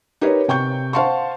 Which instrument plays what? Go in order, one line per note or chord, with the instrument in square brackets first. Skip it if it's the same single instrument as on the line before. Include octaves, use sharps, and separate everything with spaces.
[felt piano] D#4 G4 A#4 B4 C#5
C3 G5 C#6 G6
C5 F5 F#5 A5 C6 C#6